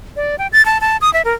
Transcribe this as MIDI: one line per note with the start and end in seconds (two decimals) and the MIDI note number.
0.16 0.36 74
0.39 0.47 79
0.53 0.64 93
0.66 0.81 81
0.81 0.97 81
1.01 1.12 87
1.14 1.22 76
1.25 1.33 70